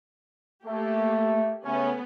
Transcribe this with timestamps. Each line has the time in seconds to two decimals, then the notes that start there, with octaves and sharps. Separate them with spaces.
0.66 A3 A#3 G4
1.65 C#3 A3 B3 C#4